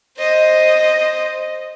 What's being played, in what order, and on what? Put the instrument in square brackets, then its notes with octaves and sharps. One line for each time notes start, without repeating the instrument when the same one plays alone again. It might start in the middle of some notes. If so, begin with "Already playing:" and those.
[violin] C5 D#5